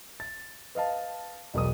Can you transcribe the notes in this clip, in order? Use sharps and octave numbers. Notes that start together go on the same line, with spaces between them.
A6
B4 D#5 F5 A5
E1 B1 A#4 D#6